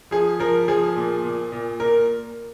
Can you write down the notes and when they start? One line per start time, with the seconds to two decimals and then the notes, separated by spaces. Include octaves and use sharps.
0.11 F3 G#4
0.40 F3 A#4
0.68 F3 G#4
0.96 A#2
1.24 A#2
1.52 A#2
1.80 A#2 A#4